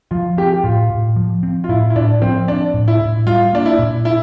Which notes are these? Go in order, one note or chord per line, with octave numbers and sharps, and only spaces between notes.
F3 F4
C4 G4
G4
A2 F4
A2
F3
C4
F4
A2 E4
E4
A2 D4
F3 C4
C4 D4
A2
E4
A2
G3 F4
A#3 D4
E4
A#2
D4 E4